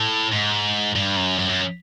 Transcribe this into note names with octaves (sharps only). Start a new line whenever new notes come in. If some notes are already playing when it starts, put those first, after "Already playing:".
Already playing: A2
G#2
G2
F#2
F#2
F#2